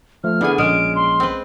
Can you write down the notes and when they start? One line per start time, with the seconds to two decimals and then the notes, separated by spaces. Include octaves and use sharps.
0.24 F3 A3 F6
0.41 D3 B3 E4 G#4 G#5
0.58 A#1 G#3 C#4 F6 D7
0.95 C6
1.20 C4 B4